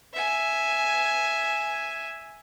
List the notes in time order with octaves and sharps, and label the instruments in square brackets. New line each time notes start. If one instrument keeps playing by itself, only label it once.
[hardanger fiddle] E5 G#5